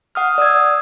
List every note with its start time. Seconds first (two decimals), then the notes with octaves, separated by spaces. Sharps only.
0.15 F#5 D#6 F6
0.38 D5 D#6 E6 G#6